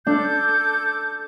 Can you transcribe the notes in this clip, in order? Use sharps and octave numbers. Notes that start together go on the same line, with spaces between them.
D4 A4 D6 G6